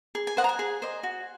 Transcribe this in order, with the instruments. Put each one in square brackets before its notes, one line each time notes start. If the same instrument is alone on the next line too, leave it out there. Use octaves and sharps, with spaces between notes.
[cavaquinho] G#4
G#5
C5 D#5 F#5
A#5
G#5
G#4
C5 D#5
F#4